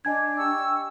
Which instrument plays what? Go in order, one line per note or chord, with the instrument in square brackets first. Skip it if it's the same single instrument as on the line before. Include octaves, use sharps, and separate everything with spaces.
[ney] D4 [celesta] D#5 G#5 G#6
[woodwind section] G4 C#6 E6